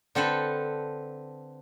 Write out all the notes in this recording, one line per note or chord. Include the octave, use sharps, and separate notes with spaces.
D3 C4 A4 B4